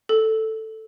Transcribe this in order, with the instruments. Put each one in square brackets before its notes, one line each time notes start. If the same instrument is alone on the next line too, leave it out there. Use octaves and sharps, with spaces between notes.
[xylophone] A4